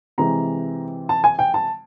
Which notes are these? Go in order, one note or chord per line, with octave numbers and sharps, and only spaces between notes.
C3 E3 G#3 C4 A#5
A5
G#5
G5
A5